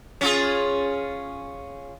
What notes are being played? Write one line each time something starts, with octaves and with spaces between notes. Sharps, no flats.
C#4 F4 G#4